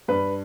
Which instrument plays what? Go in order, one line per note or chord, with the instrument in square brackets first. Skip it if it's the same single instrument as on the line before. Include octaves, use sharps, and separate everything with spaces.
[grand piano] G2 B4